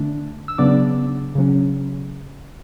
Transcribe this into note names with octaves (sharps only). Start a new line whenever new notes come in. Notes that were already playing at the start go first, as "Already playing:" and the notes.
Already playing: D3 A3 D4
E6
C#3 F#3 B3 D4 D5 D6
C#3 F#3 C#4